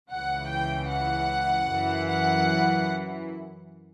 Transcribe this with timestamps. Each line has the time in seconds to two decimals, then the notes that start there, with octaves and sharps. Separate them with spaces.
0.10 C#2 C#3 E3 F#5
0.50 G5
0.90 F#5
1.69 F#2 E3
2.08 F#5